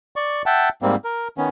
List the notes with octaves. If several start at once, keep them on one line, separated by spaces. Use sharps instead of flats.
D5 C#6
E5 F#5 G5 A5
G#2 G3 A#3 C4
A#4
D#3 B3 C#4